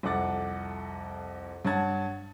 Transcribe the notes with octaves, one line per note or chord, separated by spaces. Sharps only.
C2 F2 A4 F#5 D6 A6
G2 C#5 F#5 A5 G#6 A6